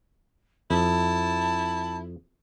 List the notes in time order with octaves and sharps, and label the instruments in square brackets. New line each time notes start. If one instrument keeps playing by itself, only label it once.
[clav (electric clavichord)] F2 [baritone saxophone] E4 [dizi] A5